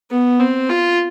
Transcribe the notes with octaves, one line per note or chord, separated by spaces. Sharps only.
B3
C4
F4